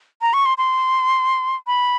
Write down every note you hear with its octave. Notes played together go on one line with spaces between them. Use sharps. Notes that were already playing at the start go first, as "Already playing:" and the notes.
A#5
C#6
C6
C6
B5